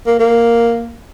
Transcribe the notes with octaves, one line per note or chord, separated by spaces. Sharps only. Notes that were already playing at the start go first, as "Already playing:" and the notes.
A#3
A#3